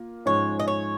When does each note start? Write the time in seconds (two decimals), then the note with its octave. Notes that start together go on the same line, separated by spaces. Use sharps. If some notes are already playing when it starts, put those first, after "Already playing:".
Already playing: A#3 F4
0.26 G#2 F3 G#3 C#4 C#5
0.60 D#5
0.68 C#5